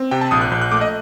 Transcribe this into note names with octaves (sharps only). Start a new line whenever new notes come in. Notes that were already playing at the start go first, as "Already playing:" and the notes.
Already playing: C4
C3 G5
A5
A#1 D#6
F#6
A#1 G6
F#6
A3 D6
D#5